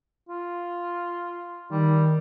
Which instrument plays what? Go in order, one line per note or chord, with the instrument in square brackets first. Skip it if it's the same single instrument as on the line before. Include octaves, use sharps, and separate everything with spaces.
[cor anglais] F4
[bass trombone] D#3 [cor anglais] G3